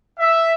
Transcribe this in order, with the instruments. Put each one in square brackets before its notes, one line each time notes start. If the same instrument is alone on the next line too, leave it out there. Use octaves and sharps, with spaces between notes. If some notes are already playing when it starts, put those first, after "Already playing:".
[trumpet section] E5